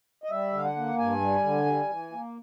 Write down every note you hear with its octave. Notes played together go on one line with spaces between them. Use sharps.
D#5
G3 E5
D3 F5
F#5
A#3
G2 G#5
G3
D3
G3
E3
A#3